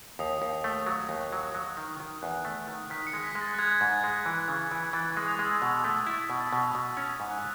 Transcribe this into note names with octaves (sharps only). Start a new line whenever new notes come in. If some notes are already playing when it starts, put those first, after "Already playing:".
D#2 D#6
D#2
A3
F#3
D#2
F#3
F#3
D#3
D#3
E2 F#6
A3
D#3
D#3 B6
C#7
G#3
B6
G#3
A6
F#6
G#3 G#6
G#2
G#3
E3
C#3
E3
E3 A6
C#6
G#3
D#6
G#3
E6
B2 D#6
D#6
A3
C#6
D#6
E4
E6
B2 E6
A6
B6
B2
D#6
B2
C#6
C#4 D#6
E6
G#2
F#6